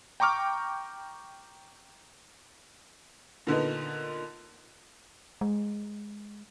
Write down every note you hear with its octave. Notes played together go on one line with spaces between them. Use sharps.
G5 A#5 C#6 D6 F6
A#2 D3 B3 D#4
G#3